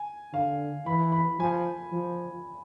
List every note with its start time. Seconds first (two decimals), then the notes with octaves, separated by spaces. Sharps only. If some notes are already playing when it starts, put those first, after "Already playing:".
Already playing: G#5
0.33 D3 F5
0.86 E3 B5
1.12 B5
1.39 F3 G#5
1.92 F3